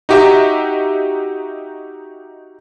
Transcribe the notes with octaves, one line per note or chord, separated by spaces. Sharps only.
D#4 F#4 G4 D#5 E5 A#5